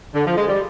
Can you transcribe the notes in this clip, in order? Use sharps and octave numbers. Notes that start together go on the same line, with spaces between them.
D3
F3
G#3
G3